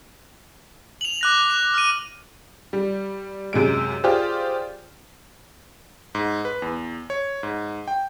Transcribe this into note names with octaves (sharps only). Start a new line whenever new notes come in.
F7 F#7
D6 F#6 A#6
F7
F6 D#7
G3
F#2 C3 G#3 D7
F4 G4 G#4 C5 D5
G#2
B4
E2
C#5
G#2
G5